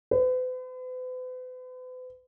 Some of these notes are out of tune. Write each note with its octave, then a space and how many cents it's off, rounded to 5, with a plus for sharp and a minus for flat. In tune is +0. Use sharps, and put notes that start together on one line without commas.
B4 +45